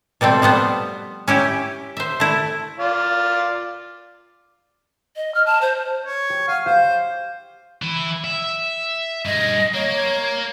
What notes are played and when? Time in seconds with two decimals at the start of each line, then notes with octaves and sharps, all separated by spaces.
0.21 B2 G3 A3 C4
0.42 F3 G3 B3 C5
1.28 C#4 E4 G4
1.97 C5 E5
2.20 A3 E4
2.79 F4 D5
5.16 D#5
5.35 F6
5.46 A5
5.61 C5
6.06 C#5
6.30 G4
6.48 F5 F#5 D#7
6.66 G4 C5 F5
7.82 E3 E4
8.24 E5
9.25 G2 G#4 D#5
9.74 A#3 C#5